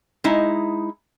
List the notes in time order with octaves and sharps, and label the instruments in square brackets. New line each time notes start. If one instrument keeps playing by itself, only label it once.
[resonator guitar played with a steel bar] G#3 D#4 E4